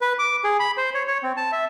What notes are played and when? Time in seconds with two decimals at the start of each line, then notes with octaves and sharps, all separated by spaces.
0.01 B4
0.19 D6
0.44 G#4
0.60 B5
0.77 C5
0.95 C#5
1.08 C#5
1.23 C4
1.37 A5
1.52 E5